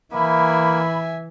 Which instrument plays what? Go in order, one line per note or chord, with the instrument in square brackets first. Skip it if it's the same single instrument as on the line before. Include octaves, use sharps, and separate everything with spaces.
[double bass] E3 [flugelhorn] A#3 [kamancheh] E5 G#5 [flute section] B5